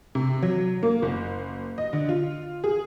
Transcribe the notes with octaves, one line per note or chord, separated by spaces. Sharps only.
C3
F#3
A#3
F#1
D#5
D3
F4
G#4